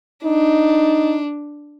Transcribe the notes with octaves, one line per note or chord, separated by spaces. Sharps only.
D4 D#4